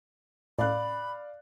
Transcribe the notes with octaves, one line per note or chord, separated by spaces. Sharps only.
A2 D5 F5 B5 F#6